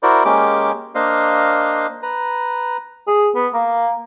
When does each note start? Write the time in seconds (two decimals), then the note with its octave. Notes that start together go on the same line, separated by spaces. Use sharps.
0.03 E4 F#4 A#4 C5 D5
0.25 G#3 A#3 C#4 G4 D6
0.95 A#3 D4 C5 D#5 F5
2.03 B4 A#5
3.07 G#4
3.35 B3
3.54 A#3